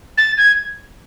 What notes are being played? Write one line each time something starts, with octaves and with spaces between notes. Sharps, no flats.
A6
G#6